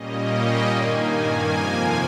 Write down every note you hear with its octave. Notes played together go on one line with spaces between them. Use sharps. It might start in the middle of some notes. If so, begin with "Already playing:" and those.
Already playing: A#2 G3 A#3 C#4 D#5
G5
G2 D#3 A#3 G#5
F2 C3 F3 A#3 G#5